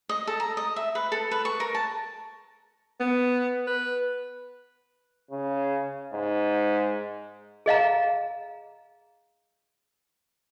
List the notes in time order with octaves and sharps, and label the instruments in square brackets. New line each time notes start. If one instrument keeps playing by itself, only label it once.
[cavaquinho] D#5
A4
A#5
D#5
E5
B4
A4
B4
C#6
A#4
A5
[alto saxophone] B3
B4
[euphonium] C#3
G#2
[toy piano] G#4 D#5 F5 A#5